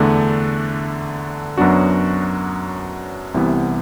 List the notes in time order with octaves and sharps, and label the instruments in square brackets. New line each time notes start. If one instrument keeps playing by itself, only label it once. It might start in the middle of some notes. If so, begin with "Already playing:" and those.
Already playing: [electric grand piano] E2 D3 A3 D4
F#2 F#3 B3 D4 F#4
C2 C3 E3 B3